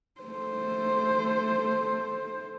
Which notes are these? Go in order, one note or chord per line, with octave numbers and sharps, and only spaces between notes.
A3 C5